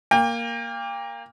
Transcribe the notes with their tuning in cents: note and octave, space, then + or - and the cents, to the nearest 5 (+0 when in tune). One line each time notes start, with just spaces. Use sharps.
A#3 +0 G5 +35